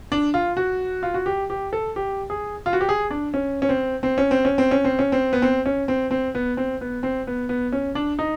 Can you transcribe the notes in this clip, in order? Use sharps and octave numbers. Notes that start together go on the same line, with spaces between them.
D4
F4
F#4
F4
F#4
G4
G4
A4
G4
G#4
F4
F#4
G4
G#4
D4
C#4
C#4
C4
C4
C#4
C4
C#4
C4
C#4
C4
C#4
C4
B3
C4
C#4
C4
C4
B3
C4
B3
C4
B3
B3
C#4
D4
D#4